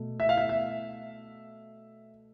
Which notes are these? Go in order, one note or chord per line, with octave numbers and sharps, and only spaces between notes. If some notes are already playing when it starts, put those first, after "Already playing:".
Already playing: B2 A3
E5
F5
E5
E5